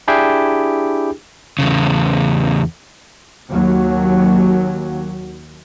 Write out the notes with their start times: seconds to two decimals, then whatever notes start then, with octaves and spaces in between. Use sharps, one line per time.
0.08 D4 E4 G4 G#4 G5
1.59 E2 G#2 C#3
3.51 D#2 F#3